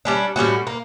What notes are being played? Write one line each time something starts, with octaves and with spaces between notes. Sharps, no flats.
G3 C#4 D4
A2 G3 C#4 F#4
A#3